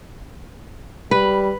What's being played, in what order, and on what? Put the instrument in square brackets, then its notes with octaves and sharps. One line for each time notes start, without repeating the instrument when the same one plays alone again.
[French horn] G3 [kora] B4